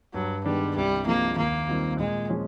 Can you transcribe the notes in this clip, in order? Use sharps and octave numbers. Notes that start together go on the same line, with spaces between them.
G2 F#3
D#3 G3 G#3 B3 D4
C2 G3
C3 F3 G#3 A#3
D#2 A#3
D#3 G3 C4 F4
A#2 G#3
F3 G#3 C#4